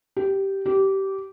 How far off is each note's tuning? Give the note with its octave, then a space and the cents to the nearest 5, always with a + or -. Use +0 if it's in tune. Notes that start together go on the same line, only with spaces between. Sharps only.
G4 -10
G4 -20